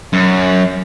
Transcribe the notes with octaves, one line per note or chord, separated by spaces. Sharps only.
F#2